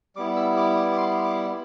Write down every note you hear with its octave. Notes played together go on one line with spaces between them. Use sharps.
G3 B3 E4 D6
E6
D6
D6
D6
C6
D6